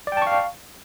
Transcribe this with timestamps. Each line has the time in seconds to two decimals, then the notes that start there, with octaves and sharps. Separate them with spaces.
0.07 D5
0.12 G5
0.17 A5
0.22 C#6
0.27 F5